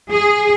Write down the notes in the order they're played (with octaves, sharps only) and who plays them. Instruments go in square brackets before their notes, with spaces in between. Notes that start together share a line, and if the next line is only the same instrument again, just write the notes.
[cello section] G#4